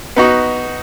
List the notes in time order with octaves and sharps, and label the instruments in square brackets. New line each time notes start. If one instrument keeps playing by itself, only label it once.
[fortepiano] B3 D#4 F#4